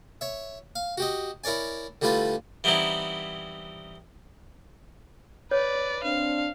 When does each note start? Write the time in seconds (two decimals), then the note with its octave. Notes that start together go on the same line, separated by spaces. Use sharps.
0.21 C#5 E5
0.76 F5
0.98 F#4 G4 D#5
1.44 E4 A#4 C#5 D5 G#5
2.02 D3 G3 A3 E4 F4 B4
2.64 E3 G3 B3 C4 D#4 E4
5.51 B4 C#5 D5
6.04 C4 D4 F5